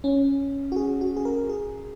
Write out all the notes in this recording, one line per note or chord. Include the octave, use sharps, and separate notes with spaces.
C#4
F#4
G#4
F#4
G#4
A#4
G#4